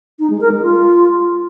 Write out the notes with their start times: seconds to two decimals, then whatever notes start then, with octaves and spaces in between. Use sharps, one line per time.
0.19 D#4
0.30 G#3
0.41 A#4
0.52 G#3
0.63 F4